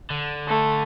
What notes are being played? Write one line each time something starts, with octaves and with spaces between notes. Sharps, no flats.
D3
A3